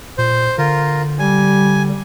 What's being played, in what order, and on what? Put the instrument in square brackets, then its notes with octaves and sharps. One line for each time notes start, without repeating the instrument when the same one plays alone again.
[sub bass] A#2 [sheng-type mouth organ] C5
[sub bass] D3 [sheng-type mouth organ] F4 A#4
[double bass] G3 [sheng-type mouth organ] G#5